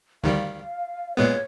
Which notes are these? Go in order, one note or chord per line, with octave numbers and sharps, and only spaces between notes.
D2 D#3 G3 F5
A#2 G#3 B3 C#5